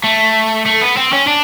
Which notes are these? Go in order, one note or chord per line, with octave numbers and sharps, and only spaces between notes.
A3
A3
B3
C4
C#4
D4